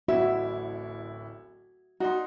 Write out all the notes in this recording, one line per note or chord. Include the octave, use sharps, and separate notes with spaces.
D1 A1 E4 F#4 E5
D#4 F#4 D5 C6